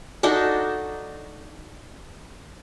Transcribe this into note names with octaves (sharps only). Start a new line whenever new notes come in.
D4 D#4 F#4 A4